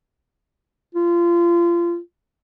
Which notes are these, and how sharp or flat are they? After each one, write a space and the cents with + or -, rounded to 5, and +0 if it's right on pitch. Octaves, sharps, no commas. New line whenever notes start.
F4 -25